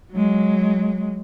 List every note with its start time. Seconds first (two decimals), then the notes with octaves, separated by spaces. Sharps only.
0.12 F#3 G#3